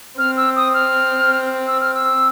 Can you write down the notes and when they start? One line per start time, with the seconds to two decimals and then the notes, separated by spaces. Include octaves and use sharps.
0.18 C4 F6
0.37 E6
0.56 D#6
0.74 F6
1.67 E6
1.80 F6
1.94 E6